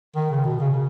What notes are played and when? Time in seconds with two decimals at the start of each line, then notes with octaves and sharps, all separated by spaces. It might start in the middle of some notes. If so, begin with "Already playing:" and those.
0.16 D#3
0.31 C#3
0.45 B2
0.60 C#3
0.74 C#3